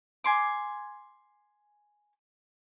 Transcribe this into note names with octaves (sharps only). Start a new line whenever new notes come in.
G#5 C6 D6